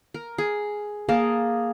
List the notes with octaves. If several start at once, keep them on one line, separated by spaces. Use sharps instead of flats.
A#4
G#4
A#3 G#4 A#4 A5